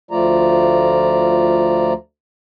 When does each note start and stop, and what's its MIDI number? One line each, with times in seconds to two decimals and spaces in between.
0.11 1.93 38
0.11 1.93 53
0.11 1.93 57
0.11 1.93 65
0.11 1.93 74
0.11 1.93 82